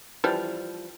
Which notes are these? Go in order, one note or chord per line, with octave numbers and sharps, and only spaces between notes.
E3 F3 G3